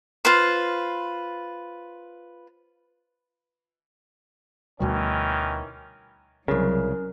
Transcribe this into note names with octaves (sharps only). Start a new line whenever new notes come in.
F4 B4 C5
D2 B2 D#3 E3 G3 C#4
C2 C#3 F#3 C#4 A#4